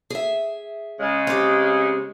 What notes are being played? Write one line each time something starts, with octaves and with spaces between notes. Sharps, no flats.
G#4 E5
C#3 G#3
C4 G4